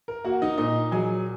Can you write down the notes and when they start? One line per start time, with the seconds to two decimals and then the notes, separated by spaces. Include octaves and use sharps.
0.08 A#4
0.25 A#3 F#4 F#5
0.42 D#4 D#5
0.58 A#2 D#4 D#5
0.91 F#3 G#4 G#5